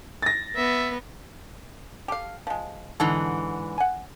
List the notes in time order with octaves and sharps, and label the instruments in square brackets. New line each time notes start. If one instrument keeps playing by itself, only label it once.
[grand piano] A6 A#6
[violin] B3 [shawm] E5
[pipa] G4 A4 F5
F3 G#3
[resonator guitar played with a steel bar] G#2 D3 E3 [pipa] A5
[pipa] F#5 G#5